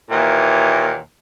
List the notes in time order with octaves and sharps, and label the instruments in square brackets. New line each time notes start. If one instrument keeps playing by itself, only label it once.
[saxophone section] D#2 A#2 E3